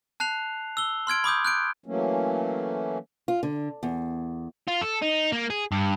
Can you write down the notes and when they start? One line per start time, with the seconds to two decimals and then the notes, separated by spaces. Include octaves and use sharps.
0.20 A5 F#6 C7 F7
0.77 E6 G7
1.07 C6 F6 G#6 D7
1.24 B5 D6 D#6 G6
1.45 F#6 G6 D7
1.86 E3 F#3 A3 A#3 C#4
3.28 F4
3.43 D3
3.83 E2
4.68 F4
4.81 A4
5.02 D#4
5.32 A#3
5.50 G#4
5.72 G2